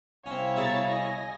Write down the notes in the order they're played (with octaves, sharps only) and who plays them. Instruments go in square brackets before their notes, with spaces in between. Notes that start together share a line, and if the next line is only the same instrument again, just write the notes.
[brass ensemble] C2 F5 [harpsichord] C4 C#4 [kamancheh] E4 C#5
[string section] B2 A#5 A6 [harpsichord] F#4 G#4 E5
[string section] D#5 G#5 A#6